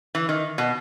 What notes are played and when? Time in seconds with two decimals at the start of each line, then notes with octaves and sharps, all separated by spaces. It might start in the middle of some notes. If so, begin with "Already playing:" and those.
0.15 E3
0.29 D#3
0.58 B2